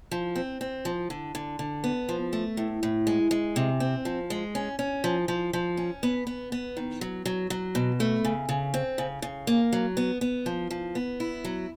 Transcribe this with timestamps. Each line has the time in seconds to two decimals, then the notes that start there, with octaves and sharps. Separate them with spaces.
0.11 F3
0.36 C4
0.61 C4
0.85 F3
1.10 D3
1.35 D3
1.59 D3
1.84 B3
2.09 F3
2.33 A3
2.57 A2
2.83 A2
3.07 G#3
3.31 G#3
3.56 C3
3.80 C4
4.05 F3
4.30 G#3
4.55 C#4
4.79 C#4
5.04 F3
5.28 F3
5.53 F3
5.77 C#4
6.03 B3
6.27 B3
6.52 B3
6.77 D#3
7.01 F#3
7.26 F#3
7.50 F#3
7.75 B2
8.00 A3
8.25 C#3
8.49 C#3
8.74 C4
8.98 C#3
9.22 C#3
9.47 A#3
9.73 F#3
9.97 B3
10.21 B3
10.46 F3
10.71 F3
10.95 B3
11.20 E4
11.45 F#3